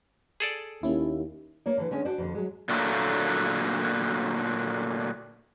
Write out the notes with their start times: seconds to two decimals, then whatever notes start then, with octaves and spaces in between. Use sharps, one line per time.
0.40 G#4 A4 D5
0.83 D#2 A#3 C#4 E4
1.66 A#3 C#5 D5
1.78 D3 E3
1.91 D3 G#3 C#4
2.05 D4 F#4 C5 D5
2.18 F2 D3
2.35 F#3 G#3
2.69 A#2 D3 F#3 A3 A#3